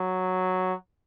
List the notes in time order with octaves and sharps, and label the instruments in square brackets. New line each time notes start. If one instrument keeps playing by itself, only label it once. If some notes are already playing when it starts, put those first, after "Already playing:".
Already playing: [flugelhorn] F#3